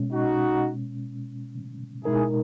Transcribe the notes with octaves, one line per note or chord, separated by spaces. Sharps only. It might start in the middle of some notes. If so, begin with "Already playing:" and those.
Already playing: B2 G#3 C#4
D#4 F#4
B2 G#3 D#4 E4 G#4 A#4